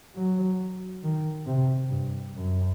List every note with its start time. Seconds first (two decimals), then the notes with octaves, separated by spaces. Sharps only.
0.15 F#3
1.03 D#3
1.46 C3
1.90 G2
2.34 F#2